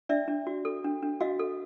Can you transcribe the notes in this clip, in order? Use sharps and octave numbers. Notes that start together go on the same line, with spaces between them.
D4 D5 E5
D4
F#4
A4
D4
D4
F#4 D#5 F5
A4